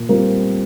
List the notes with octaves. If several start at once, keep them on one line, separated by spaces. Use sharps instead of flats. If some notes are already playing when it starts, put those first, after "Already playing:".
Already playing: A#2
G3 C4 F4 A#4